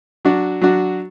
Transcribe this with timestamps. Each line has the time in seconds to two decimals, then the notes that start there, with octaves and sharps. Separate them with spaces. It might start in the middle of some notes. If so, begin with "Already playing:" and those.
0.25 F#3 D4 F#4
0.61 F#3 D4 F#4